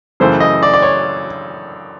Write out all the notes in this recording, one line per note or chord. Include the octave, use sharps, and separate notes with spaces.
F#2 C#3 E3 A3 C5
D#5
D5
D5
C#5